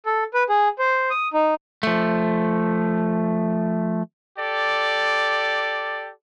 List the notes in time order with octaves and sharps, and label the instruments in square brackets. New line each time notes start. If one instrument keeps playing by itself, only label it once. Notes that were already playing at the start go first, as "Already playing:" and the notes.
[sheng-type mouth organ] A4
B4
G#4
C5
D#6
D#4
[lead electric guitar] F3 A3
[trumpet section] G4 A4 D5